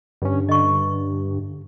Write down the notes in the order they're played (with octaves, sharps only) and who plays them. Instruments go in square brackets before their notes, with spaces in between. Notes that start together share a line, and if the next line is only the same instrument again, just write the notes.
[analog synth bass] G2 [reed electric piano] D3 C#4
[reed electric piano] D3 [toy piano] D#5 C#6